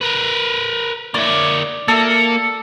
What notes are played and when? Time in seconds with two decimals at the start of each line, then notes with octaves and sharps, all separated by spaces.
0.01 A#4 B4
1.14 A#3 C#5 D5 D6
1.88 A#3 A4